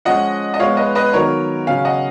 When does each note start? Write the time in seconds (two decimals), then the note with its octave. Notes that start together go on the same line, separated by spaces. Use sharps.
0.05 F3 G#3 C#4 D#5 F#5
0.54 D#5
0.60 F3 G#3 B3 C#5 F5
0.77 B4 D#5
0.95 B4 D#5
1.13 D#3 F#3 B3 A#4 C#5
1.67 C#3 F#3 C#4 F5 G#5
1.85 D#5 F#5